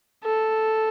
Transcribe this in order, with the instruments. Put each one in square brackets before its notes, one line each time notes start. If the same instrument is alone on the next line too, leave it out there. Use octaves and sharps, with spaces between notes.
[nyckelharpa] A4